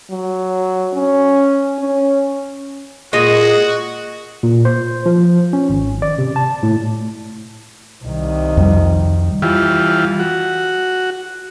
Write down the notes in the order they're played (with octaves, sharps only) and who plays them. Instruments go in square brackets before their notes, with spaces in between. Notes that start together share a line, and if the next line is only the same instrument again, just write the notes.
[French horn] F#3
C#4
C#4
[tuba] A#2 [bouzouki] G#3 [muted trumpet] F#4 [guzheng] D#5
[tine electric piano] A#2
C5
F3
C#4
G#1
D5
C3
A5
A2
[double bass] C2 D#3
[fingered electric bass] F2 G3
[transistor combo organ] E3 G3 F4
F#4